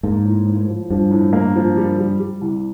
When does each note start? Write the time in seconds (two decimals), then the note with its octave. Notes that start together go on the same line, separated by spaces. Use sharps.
0.03 G#2 A#3
0.25 A2
0.47 A2
0.68 F3
0.90 G2 F3
1.11 A2
1.33 A#3
1.56 F3
1.77 G3
1.99 G3
2.20 G3
2.41 C2